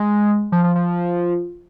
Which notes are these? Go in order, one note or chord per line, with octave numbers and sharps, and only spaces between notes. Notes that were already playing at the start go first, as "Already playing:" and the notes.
Already playing: G#3
F3
F3
F3